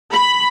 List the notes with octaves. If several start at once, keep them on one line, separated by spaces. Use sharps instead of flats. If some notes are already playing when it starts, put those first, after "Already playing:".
B5